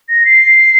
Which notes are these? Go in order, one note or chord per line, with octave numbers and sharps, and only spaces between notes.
A#6
C7